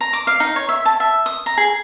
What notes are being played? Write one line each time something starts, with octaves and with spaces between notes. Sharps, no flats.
A#5
D6
F5
D#4
C#5
E5
A5
E5
D#6
A#5
G#4